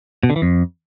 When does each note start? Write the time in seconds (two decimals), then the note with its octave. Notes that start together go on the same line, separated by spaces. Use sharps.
0.23 B2
0.30 D3
0.36 E3
0.42 F2